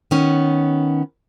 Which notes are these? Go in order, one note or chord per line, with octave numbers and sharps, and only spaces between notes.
D#3 B3 C#4